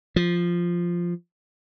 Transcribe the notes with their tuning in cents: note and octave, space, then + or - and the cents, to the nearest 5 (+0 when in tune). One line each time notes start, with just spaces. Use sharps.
F3 -5